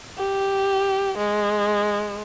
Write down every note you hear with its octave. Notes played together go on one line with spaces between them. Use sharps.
G4
G#3